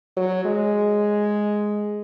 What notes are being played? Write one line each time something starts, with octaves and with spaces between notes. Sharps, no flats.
F#3
G#3